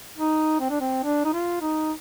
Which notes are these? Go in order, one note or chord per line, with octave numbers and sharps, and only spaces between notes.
D#4
C4
D4
C4
D4
D#4
F4
D#4